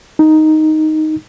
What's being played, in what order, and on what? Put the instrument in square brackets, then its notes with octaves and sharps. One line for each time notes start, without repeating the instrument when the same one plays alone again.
[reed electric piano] D#4